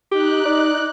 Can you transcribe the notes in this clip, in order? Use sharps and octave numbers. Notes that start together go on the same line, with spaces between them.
D#4 G4 F#6
D5